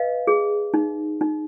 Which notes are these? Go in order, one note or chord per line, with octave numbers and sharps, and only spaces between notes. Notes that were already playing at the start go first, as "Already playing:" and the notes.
Already playing: B4 D#5 F5
G#4
D#4
D#4